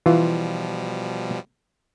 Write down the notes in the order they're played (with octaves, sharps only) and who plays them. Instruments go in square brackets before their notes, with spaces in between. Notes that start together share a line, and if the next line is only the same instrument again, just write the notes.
[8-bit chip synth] B2 F3 G3 [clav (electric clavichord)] E3 F4